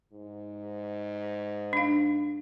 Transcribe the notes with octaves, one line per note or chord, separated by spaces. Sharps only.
G#2
D4 F5